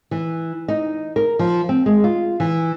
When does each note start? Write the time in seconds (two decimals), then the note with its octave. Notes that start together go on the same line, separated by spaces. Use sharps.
0.11 E3
0.68 D#4
1.16 A#4
1.39 F3
1.69 C4
1.86 G#3
2.04 F4
2.40 E3